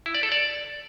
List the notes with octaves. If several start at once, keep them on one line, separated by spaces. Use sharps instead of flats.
E4
D5
A4
D5